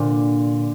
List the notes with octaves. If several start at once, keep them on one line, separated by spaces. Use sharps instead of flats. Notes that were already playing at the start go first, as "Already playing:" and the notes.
Already playing: A#2 D3